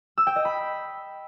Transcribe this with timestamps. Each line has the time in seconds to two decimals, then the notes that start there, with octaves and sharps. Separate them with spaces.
0.18 E6
0.27 G5
0.36 D#5
0.45 B5